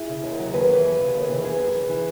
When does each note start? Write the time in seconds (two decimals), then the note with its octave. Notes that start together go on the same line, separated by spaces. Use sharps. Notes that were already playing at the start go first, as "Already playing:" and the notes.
Already playing: E4 G#4
0.09 C#3
0.24 D#2
0.38 F#3
0.54 D#2 G#4 B4
0.69 E3
0.84 D#2
0.99 C#3
1.14 D#2
1.29 E3
1.44 F#2 G#4 B4
1.60 F#2
1.75 E3
1.89 E3